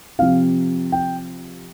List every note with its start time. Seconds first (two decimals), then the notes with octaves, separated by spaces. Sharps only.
0.19 C3 F3 F5
0.92 G5